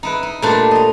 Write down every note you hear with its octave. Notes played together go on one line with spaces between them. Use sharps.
D#4 E4 B4
D#4
A#2 G3 A3 D4 B4 C5
D#5 A#5